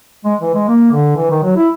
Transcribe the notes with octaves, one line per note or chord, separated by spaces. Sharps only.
G#3
E3
G#3
A#3
D3
E3
D#3
F#3
E4